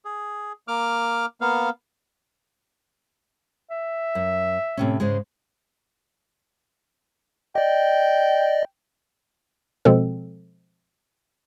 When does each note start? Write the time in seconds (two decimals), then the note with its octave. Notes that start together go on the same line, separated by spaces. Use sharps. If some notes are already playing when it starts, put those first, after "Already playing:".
0.05 G#4
0.68 A#3 D6 F6
1.41 A#3 B3 F5
3.70 E5
4.15 F#2
4.77 A2 C3 C#4
5.00 G#2 C#3 G#3
7.55 D5 D#5 G5
9.85 B2 F3 G#3 C4 A4